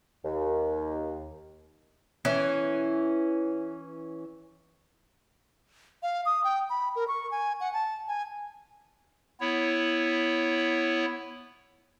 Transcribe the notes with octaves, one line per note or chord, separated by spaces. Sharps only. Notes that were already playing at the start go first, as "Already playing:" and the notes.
D#2
E3 C#4
F5
D#6
G5
B5
A#4
C#6
G#5
F#5
A5
G#5
B3 E4 C#5